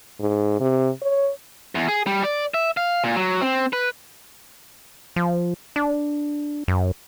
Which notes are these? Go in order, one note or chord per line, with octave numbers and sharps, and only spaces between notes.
G#2
C3
C#5
E2
G#4
G3
D5
E5
F5
A#2
F#3
C4
B4
F3
D4
F#2